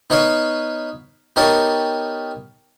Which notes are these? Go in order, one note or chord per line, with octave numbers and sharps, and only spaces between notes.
B3 D#4 B4 C#5 F5
B3 D#4 G4 A#4 C#5 A5